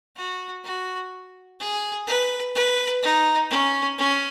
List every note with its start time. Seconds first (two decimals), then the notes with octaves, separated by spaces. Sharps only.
0.16 F#4
0.64 F#4
1.60 G#4
2.07 B4
2.55 B4
3.03 D#4
3.50 C#4
3.98 C#4